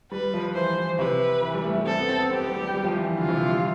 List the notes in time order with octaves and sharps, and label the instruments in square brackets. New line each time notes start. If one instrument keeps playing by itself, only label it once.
[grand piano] G3 [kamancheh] B4
[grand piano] F3
[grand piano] E3 [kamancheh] C5
[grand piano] E3
[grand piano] C3 [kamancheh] B4
[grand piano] E3
G3
A3
G3
[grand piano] C4 [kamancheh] A4
[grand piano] B3
C4
B3
[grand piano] C4 [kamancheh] G4
[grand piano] B3
G3
G3
G3
F3
E3
E3
[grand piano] D3 [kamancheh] F4
[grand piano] C3
E3
G3